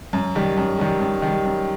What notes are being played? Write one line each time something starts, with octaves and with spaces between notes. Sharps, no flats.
F#2
D#3 G3
F#2
D#3 G3
F#2
D#3 G3
F#2